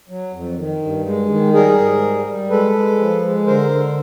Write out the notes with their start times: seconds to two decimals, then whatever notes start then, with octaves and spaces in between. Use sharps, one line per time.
0.09 F#3
0.33 F2
0.57 D#3
0.81 G2
1.06 G#3
1.30 D#3
1.54 G3 G#4 A#4
1.78 G#2
2.02 G3
2.25 G3
2.50 G#3 A4 B4
2.74 G#3
2.98 F3
3.22 G#3
3.46 D3 A#4 C5
3.70 D3